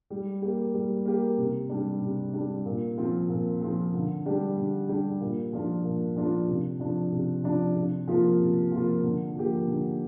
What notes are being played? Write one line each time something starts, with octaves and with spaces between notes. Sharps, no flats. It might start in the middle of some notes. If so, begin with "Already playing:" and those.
G3
A#3 G4
G3
A#3 G4
C3
G3 D4
C3
G3 D4
A#2
F3 C4 F4
A#2
F3 C4 F4
D3
G3 D4 G4
D3
G3 D4 G4
A#2
F3 D4 F4
A#2
F3 D4 F4
C3
F3 D4
C3
F3 D4
C3
F3 A#3 F4
C3
F3 A#3 F4
D3
F3 A#3 G4
D3